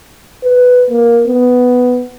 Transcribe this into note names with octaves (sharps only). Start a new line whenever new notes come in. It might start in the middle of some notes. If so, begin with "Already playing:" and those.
B4
A#3
B3